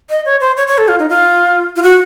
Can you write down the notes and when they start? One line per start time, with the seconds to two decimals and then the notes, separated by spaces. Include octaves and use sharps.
0.10 D#5
0.25 C#5
0.41 C5
0.57 C#5
0.67 C#5
0.78 A4
0.88 F4
0.99 D#4
1.09 F4
1.76 F4
1.82 F#4